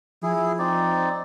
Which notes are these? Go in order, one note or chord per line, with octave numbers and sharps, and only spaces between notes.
F3 E4 G#4
C4 D#4 D5